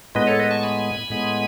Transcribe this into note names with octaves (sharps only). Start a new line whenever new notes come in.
A2 G#3 B3 B4 D#5
A4 C#5
B4 D#5
A5 C#6
G#5 B5
A2 G#3 B3